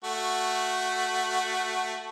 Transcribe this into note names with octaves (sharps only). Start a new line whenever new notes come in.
A3 F#4